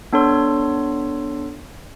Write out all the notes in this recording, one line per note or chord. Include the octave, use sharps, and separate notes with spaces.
B3 D4 A4 C#5 C6